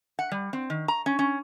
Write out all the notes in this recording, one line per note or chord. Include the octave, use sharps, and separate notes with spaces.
F#5
G3
C4
D#3
A#5
C#4
C#4